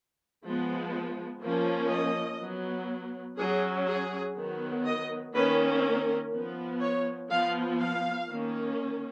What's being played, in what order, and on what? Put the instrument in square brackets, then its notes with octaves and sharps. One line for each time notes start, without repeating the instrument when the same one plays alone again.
[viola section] F3 G#3 B3
F3 A#3 C#4
D#5
F#3 B3
F#3 C#4 G#4
G#4
D#3 F#3 B3
D#5
D#3 A#3 C#4 B4
A#4
F3 B3
C#5
F3 B3 F5
F5
D#3 A#3 C#4